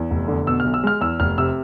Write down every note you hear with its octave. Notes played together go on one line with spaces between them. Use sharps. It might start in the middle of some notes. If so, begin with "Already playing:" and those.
Already playing: E2
F1
D3
B2 E6
F6
B1
E6
G#3 F6
E2 E6
F1 F6
C3 E6